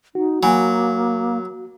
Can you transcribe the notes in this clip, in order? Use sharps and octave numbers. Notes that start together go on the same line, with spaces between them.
D#4 F#4
F#3 A#3 G#5 B5